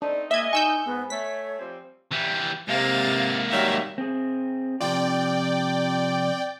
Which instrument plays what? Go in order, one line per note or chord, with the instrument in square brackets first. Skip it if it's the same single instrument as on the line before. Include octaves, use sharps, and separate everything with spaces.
[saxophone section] A3 C4 D#4 [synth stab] D4
[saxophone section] G#3 D4 D#5 [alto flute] A#3 [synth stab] E5 G#6
[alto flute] D#4 [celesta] G#5 [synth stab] C#6 E6 G6
[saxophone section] G#2 [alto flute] B3
[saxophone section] A3 [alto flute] C#5 [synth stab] B6
[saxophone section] F3 G3 C4
[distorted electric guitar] E3 G3
[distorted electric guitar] G#2 A#3 [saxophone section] C3 [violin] F5 A6
[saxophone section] D#3 F#3 G3 [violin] E5 F5
[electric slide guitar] C4 G#4
[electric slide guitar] C3 F3 F4 [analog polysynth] D5 G5